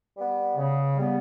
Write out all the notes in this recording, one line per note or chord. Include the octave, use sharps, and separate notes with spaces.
G3 B3
C#3
G3 B3